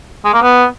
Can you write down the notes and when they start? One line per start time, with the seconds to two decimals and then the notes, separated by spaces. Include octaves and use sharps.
0.25 G#3
0.34 A#3
0.42 B3